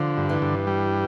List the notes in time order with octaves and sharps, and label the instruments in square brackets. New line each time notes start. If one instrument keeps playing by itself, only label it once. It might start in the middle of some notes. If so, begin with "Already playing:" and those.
Already playing: [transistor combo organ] D3 [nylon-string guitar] F3
[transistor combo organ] G2
[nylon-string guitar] E3
[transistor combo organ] G2
G3